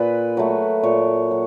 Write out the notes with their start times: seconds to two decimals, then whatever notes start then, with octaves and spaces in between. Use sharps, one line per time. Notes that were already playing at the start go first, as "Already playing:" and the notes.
Already playing: A#2 B4
0.37 F#3 A3
0.83 A#2 C#5
1.31 F#3